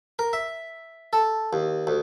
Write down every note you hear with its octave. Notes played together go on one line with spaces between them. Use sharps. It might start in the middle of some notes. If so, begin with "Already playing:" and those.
A#4
E5
A4
D#2
D2